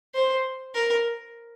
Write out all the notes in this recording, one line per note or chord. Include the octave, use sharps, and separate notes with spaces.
C5
A#4